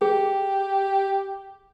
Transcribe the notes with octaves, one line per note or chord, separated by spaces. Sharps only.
G4 G#4